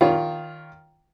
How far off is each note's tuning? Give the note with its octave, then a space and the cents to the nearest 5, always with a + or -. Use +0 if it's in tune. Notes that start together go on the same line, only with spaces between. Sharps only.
D#3 +5 F4 +0 C#5 +45